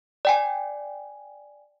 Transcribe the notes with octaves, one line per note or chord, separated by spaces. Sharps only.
D5 G5 G#5